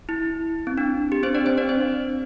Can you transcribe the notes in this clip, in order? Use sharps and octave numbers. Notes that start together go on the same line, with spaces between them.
E4
C4
D4
G4
C4 C5
D4 D5
C4 C5
D4 D5
C4 C5